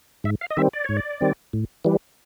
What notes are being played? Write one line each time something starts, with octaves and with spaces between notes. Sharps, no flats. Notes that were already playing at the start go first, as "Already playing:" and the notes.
G#2 E5
F5
D#5
D#3 G3 C4 E5
D5
G#2 C#5
D5
D#3 G3 C4
A2
E3 G3